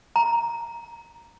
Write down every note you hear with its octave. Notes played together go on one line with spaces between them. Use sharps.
A#5